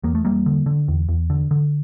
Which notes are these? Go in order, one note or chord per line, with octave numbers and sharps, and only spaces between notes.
E2 A#3
A3
E2 G3 A#3
D3
D3
E2
E2
D3
D3